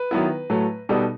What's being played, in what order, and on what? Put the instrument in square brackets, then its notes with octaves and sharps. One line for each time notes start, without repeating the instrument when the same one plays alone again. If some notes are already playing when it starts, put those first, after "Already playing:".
Already playing: [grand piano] B4
D#3 F#3 B3 E4
A2 F#3 A3
B2 G3 B3 D#4 A4